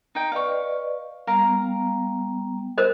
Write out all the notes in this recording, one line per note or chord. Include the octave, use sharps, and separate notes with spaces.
D#4 G5
B4 D5 D#5 F5 C#6
G3 B3 A#4 F5 G5 A#5
A#4 C5 D#5